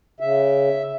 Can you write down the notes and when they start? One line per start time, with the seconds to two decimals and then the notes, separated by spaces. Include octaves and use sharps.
0.20 C#3 E5